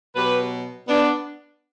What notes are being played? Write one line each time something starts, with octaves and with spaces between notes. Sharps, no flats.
B2 F#3 G4 B4
B3 D4